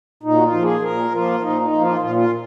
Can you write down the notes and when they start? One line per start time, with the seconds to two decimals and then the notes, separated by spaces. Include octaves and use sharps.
0.23 A#2 D#4
0.35 F#4
0.42 F4
0.52 F3 A#3
0.62 G#4
0.82 A#2 A#4
1.12 F3 A#3 F4
1.41 A#2 D#4
1.61 D#4
1.72 F3 A#3
1.81 F4
2.01 A#2 F4
2.16 F4